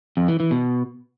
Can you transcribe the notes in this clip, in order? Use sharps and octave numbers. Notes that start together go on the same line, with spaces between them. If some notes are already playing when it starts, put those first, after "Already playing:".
F2
E3
E3
B2